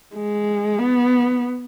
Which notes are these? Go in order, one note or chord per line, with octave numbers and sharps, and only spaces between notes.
G#3
B3